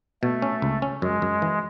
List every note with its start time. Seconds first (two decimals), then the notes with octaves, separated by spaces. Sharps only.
0.23 B2 A3
0.42 C#4
0.62 C#2
0.82 C#4
1.02 F#2 G#3
1.22 F#2
1.42 E3